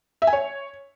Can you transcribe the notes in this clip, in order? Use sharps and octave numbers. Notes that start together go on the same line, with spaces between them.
E5
G#5
C#5